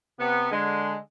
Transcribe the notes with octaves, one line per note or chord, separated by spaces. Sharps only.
C3 B3
D3 G#3